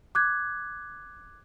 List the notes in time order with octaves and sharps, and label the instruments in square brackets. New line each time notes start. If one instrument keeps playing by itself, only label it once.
[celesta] D6 F#6 G#6